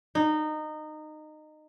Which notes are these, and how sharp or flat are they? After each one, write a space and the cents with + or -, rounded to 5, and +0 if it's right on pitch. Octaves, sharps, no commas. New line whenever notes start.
D#4 -20